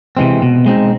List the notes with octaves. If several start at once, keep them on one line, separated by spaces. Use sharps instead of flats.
C3 E3 G#3 C4
B2
G#3 C4 D#4